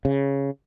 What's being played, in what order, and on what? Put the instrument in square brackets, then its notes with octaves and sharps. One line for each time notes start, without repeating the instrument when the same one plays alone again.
[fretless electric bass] C#3